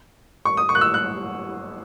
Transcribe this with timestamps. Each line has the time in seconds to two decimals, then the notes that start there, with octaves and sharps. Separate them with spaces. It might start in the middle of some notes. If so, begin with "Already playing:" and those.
0.45 C#6
0.57 D#6
0.69 C#6
0.75 F#6
0.81 E6
0.94 F#6